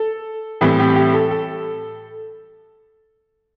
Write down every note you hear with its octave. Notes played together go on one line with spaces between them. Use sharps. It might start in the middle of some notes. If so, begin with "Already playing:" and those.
Already playing: A4
A2 E3 G3 C4
G4
G4
A4
A4